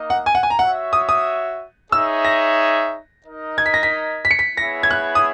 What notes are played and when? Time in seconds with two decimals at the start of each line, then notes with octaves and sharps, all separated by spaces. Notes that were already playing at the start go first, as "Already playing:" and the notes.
Already playing: A#3 D#4 A#4 D#5
0.10 F#5
0.26 G#5
0.35 F#5
0.43 G#5
0.50 A#5
0.59 F#4 C#5 E5 F#5
0.93 D#6
1.09 D#6
1.92 D#4 G#4 C#5 E5 E6
2.25 A#6
3.25 D#4 A#4 D#5
3.58 G#6
3.66 B6
3.74 A#6
3.83 B6
4.25 B6
4.31 C#7
4.39 B6
4.57 B3 E4 G#4 C#5 E5 A#6
4.83 G#6
4.91 F#6
5.15 D#6